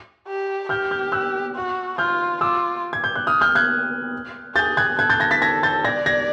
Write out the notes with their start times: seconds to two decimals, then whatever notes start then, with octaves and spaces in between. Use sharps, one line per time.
0.27 G4
0.69 G4 F6 G6
0.91 F6 G6
1.12 E6 F#6
1.55 F#4
1.98 F4 F6 G6
2.41 F4 D6 E6
2.93 G#6
3.04 G6
3.16 F#6
3.27 D#6 F6
3.41 F6 G6
3.55 F#6 G#6
4.55 G#4 G6 A6
4.77 F#6 G#6
4.99 A4 F#6 G#6
5.10 G6 A6
5.20 G#6 A#6
5.31 A6 B6
5.42 A4 G#6 A#6
5.63 G6 A6
5.84 D5 G#6 A#6
6.06 G#6 A#6